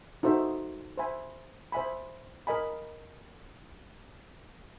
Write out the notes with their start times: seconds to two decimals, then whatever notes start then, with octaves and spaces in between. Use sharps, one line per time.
0.23 D#4 F#4 A4 C5 E5
0.97 C5 E5 G#5 B5
1.72 C5 E5 G#5 B5
2.47 A#4 D#5 G#5 B5